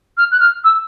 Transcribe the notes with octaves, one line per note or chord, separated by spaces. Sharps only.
F6
F#6
F6
E6